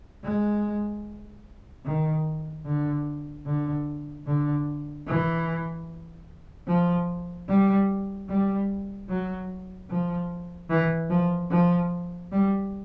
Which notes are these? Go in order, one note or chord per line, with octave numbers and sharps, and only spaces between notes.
G#3
D#3
D3
D3
D3
E3
F3
G3
G3
F#3
F3
E3
F3
F3
G3